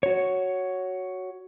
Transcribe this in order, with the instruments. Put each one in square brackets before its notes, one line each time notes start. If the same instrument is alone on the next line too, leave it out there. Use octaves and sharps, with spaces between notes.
[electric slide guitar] F#4 C#5